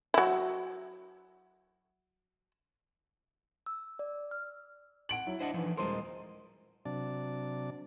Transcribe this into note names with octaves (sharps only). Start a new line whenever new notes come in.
F#3 E4
E6
D5
F6
F#5 D7 F#7
F#3 E4
D4 C5 D#5 F#5
E3 F3 D4 D#4
D#1 G#3 A#4 C5 D#5 C6
C3 F#3 D4 D5 A5